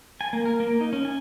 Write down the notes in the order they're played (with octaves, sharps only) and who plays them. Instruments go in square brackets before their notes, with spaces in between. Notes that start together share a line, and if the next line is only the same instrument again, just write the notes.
[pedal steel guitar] G#5
A#3
A#4
A#3
D#4
C#4
G#5